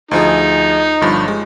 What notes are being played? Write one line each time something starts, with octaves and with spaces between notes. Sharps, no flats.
D2 F3 D#4 G#4
G1 G2 F3
G#3